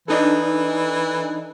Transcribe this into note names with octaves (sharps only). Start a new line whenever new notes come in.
E3 D4 D#4 A4